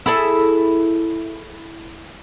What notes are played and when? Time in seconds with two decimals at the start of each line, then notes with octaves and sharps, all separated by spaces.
0.06 E4 G#4 A4